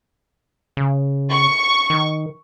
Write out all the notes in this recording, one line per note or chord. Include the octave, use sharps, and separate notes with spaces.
C#3
C#6
D#3